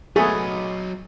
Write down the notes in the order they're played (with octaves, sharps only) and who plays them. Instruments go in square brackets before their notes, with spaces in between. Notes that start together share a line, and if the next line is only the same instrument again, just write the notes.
[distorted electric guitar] F#3 D#5 [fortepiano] A3 B3 [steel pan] G#4